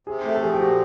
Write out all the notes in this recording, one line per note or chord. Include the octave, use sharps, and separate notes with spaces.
C3 G#4
A3
A4
F3 G#4
G4
A#2 F#4